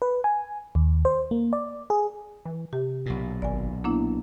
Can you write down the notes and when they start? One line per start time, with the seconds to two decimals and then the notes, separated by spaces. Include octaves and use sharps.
0.02 B4
0.24 G#5
0.75 D#2
1.05 C5
1.31 A#3
1.53 D5
1.90 G#4
2.45 E3
2.73 C3 G4
3.06 B1 A#2
3.42 G#1 D5 G#5
3.84 A#3 B3 D4 E4